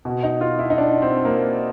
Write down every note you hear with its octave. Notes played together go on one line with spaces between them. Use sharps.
B2
D#4
F4
E4
D#4
D4
C4
A#3